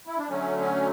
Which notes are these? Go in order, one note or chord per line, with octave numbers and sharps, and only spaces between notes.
E4
D4
D3 F#3 A3 C#4
C#4